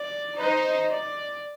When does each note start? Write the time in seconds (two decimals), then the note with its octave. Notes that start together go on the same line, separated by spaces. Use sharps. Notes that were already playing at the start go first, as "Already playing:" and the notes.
Already playing: D5
0.38 D#4 C5
0.91 D5